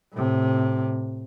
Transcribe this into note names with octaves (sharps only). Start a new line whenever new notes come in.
A2 C3